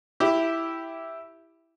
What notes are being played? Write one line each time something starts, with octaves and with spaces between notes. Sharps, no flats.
E4 G4